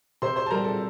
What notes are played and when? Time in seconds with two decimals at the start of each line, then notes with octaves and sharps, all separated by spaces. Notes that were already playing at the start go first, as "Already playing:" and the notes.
0.22 C3 C5 C6
0.36 C5 C6
0.46 A5
0.50 G3 A#4 A#5
0.64 A4 A5